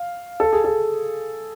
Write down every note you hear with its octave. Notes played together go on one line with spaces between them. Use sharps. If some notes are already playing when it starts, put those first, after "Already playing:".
Already playing: F5
A4
G#4
A4